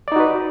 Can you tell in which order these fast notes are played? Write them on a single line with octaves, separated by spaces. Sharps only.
D5 D#4 F#4 B4